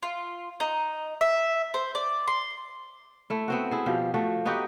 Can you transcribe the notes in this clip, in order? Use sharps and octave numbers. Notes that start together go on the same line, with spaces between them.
F4
D#4
E5
C5
D5
C6
A3 E4
B3 C4 F#4
E4 G#4
B2 F3 G4
F3 A3 F#4
B3 D#4 F#4 G4